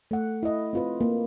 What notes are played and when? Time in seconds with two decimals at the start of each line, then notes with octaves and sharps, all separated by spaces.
0.11 A3 F#5
0.43 E4 A4 D#5
0.73 C4 F4 B4
1.01 A#3